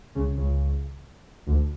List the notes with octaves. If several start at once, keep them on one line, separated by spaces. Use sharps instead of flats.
C#2 C#3
C#2 C#3
D2 D3